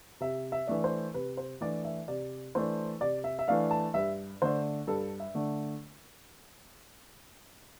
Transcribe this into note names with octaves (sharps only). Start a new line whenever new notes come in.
C3 E5
E5
E3 A3 D4
C5
C3 B4
C5
E3 A3 D4 D5
E5
C3 D5
E3 A3 D4 C5
C3 D5
E5
E5
E3 A3 D4 F5
A5
G2 E5
D3 A3 D4 C5
G2 A4
E5
D3 A3 D4